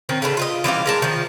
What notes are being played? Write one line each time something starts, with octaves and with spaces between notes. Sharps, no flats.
D#3 C4 C#4
C#3 D4 A4 B4
F4 A#4 D#5
E3 G3 C#4 F5
G#3 A#4 A5
D#3 F3